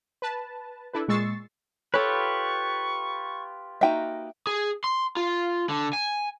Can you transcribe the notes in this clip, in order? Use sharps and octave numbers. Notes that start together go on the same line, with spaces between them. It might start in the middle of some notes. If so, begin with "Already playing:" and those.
B4 A5
D4 E4 A4 B4
A#2 G#3 C#6 E6 A6 C7
F4 G4 A4 B4 C#5 C#6
A#3 D#4 F#4 E5 G5
G#4
C6
F4
D3
G#5